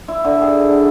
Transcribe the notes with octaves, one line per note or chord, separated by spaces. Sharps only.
E4
D3
G#4
D3